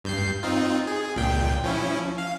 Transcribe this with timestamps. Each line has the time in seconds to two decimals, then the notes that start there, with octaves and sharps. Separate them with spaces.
0.04 G2 G6 C7
0.43 C4 D#4 F4
0.87 G#4
1.16 C#2 A#2 G5
1.64 F3 C#4 E4
2.18 F5